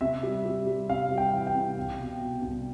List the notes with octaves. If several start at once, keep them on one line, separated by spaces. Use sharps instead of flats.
C3 E5
G3
G3
G3
C3 F5
G3
G5
E3
G5
C3
C2
B2
B2
C2